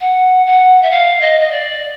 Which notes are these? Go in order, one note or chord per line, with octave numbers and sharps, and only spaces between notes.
F#5
F#5
E5
F5
D#5
D#5
D5